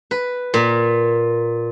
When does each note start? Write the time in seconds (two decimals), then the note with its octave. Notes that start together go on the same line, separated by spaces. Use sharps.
0.11 B4
0.54 A#2